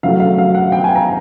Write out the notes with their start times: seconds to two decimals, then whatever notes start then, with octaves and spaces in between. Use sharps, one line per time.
0.03 C#3 F#3 A3 F5
0.20 F5
0.38 F5
0.55 F#5
0.72 G5
0.84 G#5
0.95 A#5